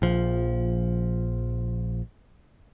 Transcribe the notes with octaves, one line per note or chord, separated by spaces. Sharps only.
A#1 F3